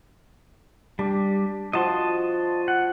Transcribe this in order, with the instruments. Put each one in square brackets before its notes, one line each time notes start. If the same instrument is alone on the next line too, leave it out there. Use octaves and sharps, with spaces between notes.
[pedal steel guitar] G3 [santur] D4
[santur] F3 F#4 [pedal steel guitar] D#5 A5 C6
[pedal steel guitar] F#5